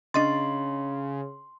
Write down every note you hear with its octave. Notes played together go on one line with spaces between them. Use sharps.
C#3 D4 D#5 C6 A6